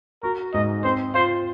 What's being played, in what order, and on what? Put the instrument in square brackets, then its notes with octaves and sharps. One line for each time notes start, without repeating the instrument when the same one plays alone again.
[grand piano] F#4 [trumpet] A#4
[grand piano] G#2 [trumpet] D#5
[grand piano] C4 [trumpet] C5
[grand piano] F4 [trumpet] C5